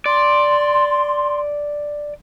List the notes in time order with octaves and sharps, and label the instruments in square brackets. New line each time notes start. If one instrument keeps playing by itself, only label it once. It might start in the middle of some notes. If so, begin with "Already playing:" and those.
[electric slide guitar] D5 [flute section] C6